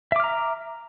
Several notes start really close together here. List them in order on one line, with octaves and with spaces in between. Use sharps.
E5 D6 F6 A#5